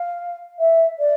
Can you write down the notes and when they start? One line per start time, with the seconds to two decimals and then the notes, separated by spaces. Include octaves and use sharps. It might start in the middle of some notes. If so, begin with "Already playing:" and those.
Already playing: F5
0.59 E5
0.98 D5